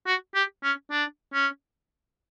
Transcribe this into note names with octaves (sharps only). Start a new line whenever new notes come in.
F#4
G4
C#4
D4
C#4